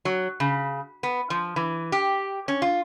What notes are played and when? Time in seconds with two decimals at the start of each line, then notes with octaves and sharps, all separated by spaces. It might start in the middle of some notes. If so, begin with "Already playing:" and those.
0.05 F#3
0.40 C#3
1.03 B3
1.30 F3
1.56 E3
1.92 G4
2.48 C#4
2.62 F4